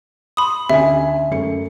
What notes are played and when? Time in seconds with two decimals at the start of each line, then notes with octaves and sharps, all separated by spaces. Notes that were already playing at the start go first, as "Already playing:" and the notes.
0.37 B5 C6 D#6
0.70 D2 C#4 E5 G#5
1.31 F#2 A3 C#7